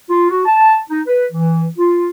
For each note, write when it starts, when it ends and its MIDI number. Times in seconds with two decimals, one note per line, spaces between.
0.10 0.29 65
0.30 0.44 66
0.46 0.79 81
0.90 1.01 63
1.07 1.25 71
1.32 1.68 52
1.78 2.10 65